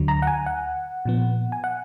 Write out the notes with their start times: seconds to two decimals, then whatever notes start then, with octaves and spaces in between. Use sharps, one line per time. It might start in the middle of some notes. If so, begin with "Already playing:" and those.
Already playing: D2 D3 F#3
0.08 A#5
0.22 F#5
0.27 G#5
0.46 F#5
1.05 A#2 F3 B3
1.52 G#5
1.64 F#5